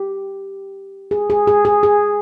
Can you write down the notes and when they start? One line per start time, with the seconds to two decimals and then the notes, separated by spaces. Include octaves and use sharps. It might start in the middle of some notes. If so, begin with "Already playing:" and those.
Already playing: G4
1.11 G#4
1.30 G#4
1.47 G#4
1.65 G#4
1.83 G#4